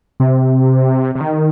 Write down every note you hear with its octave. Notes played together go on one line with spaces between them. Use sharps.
C3
C3
D#3